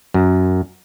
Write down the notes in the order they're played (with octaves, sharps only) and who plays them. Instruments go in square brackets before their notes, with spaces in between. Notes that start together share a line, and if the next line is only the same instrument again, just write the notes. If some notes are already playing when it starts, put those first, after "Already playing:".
[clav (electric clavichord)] F#2